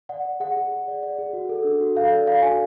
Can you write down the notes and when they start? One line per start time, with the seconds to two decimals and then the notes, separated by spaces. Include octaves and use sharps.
0.09 D5 F#5
0.25 D5
0.40 G#4 F#5
0.57 G#4
0.72 G#4
0.88 D5
1.03 D5
1.19 G#4
1.33 F#4
1.49 A4
1.64 D4
1.81 F#4
1.95 A4 F5
2.12 D5
2.27 D5 F5
2.42 F#4 G#5